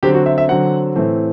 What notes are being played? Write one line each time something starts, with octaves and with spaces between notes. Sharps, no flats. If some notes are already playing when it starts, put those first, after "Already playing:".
D3 F#3 C4 G4
F#4
E5
E5
D3 F#3 C4 F#5
A2 E3 A3 C4